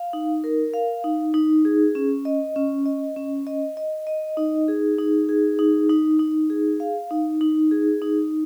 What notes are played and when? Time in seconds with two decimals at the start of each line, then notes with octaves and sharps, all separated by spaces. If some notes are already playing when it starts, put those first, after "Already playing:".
Already playing: F5
0.13 D#4
0.44 A#4
0.74 F5
1.04 D#4
1.34 D#4
1.65 G#4
1.95 C#4
2.25 D#5
2.56 C#4
2.86 D#5
3.16 C#4
3.47 D#5
3.77 D#5
4.07 D#5
4.37 D#4
4.68 G#4
4.99 D#4
5.29 G#4
5.59 D#4
5.90 D#4
6.19 D#4
6.50 G#4
6.80 F5
7.11 D#4
7.41 D#4
7.71 G#4
8.02 D#4